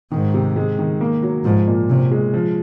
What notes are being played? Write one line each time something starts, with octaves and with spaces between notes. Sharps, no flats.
G#2 D#3
C3
G#3
D#3
A#3
F#3
G#2 F3
A#2
C3 C#4
G#3
F3